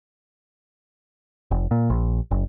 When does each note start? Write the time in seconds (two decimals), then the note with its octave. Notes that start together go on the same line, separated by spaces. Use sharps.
1.51 F1
1.71 A#2
1.90 A#1
2.31 F#1